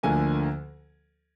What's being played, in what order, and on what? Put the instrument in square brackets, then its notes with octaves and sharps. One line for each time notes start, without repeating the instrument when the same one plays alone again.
[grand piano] D2 D3 F3 A#3 G#5